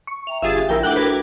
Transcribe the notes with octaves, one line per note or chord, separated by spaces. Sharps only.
C#6
E5 G5 A#5 F7
G1 F4 G4 G#4 E5 F5 A6
A#1 E4 A#4 G5
A3 D4 A4 F#5 G5 D6 F#6
F#4 A#4 B4 D6 G#6